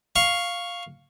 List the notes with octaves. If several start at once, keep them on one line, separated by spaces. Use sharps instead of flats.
F5 C#6